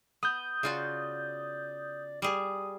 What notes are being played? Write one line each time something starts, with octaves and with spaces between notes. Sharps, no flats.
B3 D#6 G6
C#3 F4 F#4 D5
G3 G#4 D#6